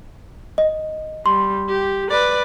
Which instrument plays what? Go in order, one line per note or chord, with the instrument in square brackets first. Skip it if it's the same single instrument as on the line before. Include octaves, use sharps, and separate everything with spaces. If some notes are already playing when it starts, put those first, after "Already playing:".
[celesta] D#5
[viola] G3 [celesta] C6
[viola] G4
B4 D5